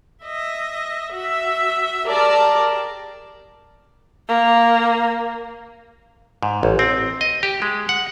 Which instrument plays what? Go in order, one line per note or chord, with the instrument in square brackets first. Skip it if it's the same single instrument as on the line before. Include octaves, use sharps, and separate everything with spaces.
[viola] D#5 E5
F#4 E5
[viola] G4 G#4 [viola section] A#4 D5 A5
[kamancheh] A#3
[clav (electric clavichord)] G#2
A1
C4
D#5
G4
G#3
F#5